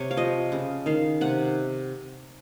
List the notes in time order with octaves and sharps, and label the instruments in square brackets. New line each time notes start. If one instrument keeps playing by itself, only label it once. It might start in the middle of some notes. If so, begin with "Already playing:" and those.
Already playing: [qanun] C3 C#5
F5
F3 D#5
C#3
D#3 F5
C3 F#5